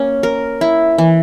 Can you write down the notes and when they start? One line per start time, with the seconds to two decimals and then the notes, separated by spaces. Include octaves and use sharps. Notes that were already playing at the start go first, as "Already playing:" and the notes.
Already playing: A#3 C#4
0.23 A#4
0.61 E4
0.98 E3